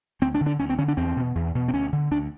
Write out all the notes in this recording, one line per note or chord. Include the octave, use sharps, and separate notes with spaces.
D2 C4
D4
D3
D4
D2 C#4
C4
D3 C#4
D4
E2 C4
B2
E2
B2
C4
D2 C#4
D3
D2 D4